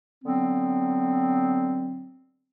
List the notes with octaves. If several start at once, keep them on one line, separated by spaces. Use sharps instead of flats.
D3 F#3 B3 C4